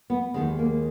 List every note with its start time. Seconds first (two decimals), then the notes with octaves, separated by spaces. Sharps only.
0.10 B3
0.34 D#2 D#3 G#3 B3
0.59 A#3